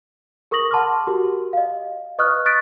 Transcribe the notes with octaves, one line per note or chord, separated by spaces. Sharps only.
G#4 A#4 C#6 D#6 A#6 F#7
F#5 A5 B5 C6 D6 F6
F#4 G4 A#4
D#5 F5
B4 D#5 C#6 D#6 F6 F#6
C#6 D#6 F#6 A6 B6 D7